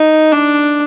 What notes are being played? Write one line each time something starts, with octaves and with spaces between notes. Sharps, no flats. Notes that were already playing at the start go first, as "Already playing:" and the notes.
Already playing: D#4
D4